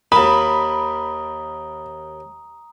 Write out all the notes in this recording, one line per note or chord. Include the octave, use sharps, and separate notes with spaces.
D#2 D#3 A#5 B5 D#6